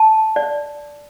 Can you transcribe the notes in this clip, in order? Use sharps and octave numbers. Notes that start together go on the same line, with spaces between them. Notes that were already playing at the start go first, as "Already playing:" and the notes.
Already playing: A5
D5